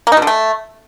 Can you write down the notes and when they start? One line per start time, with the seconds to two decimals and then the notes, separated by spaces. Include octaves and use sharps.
0.07 A#3
0.12 D#4
0.17 B2
0.22 D3
0.27 A3